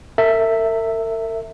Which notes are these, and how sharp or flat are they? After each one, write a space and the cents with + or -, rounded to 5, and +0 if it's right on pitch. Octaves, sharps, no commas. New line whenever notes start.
A#4 -45 E5 +0